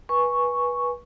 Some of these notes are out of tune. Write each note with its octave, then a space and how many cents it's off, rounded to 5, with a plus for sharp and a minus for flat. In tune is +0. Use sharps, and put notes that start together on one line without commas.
B4 -20 G#5 +0 C#6 +0